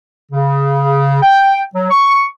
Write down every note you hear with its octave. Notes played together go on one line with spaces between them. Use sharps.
C#3
G5
F#3
C#6